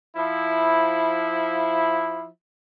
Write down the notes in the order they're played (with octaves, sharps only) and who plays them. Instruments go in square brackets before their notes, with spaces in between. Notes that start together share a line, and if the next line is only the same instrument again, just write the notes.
[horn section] F3 E4